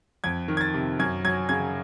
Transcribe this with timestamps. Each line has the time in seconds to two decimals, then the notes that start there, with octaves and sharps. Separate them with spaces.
0.24 F2 G#6
0.48 D#3
0.57 G#6
0.61 A6
0.74 C3
0.99 F#2 G#6
1.25 F#3 G#6
1.49 C#3 G#6